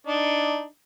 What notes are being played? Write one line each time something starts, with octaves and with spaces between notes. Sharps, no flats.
D4 D#4